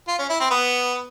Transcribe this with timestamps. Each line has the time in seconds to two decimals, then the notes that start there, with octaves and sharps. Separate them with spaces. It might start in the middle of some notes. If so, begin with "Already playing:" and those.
0.08 F4
0.19 C#4
0.29 E4
0.40 C4
0.51 B3